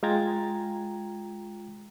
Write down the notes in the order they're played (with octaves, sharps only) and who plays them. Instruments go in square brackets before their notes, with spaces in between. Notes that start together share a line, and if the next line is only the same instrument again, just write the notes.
[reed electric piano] G#3 F4 G5 A#5 G#6 A6